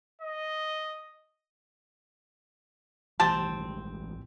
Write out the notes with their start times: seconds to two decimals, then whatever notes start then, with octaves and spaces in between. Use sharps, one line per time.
0.21 D#5
3.20 A1 G2 E3 C4 G4 A5